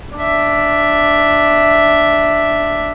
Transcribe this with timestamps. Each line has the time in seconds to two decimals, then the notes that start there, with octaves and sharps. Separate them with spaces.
0.18 D4 E5